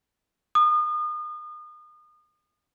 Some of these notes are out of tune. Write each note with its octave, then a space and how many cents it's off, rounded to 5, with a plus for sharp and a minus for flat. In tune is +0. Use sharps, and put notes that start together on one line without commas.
D#6 -35